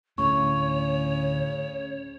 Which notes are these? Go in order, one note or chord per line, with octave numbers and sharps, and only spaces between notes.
D2 A2 C#3 C#5 C#6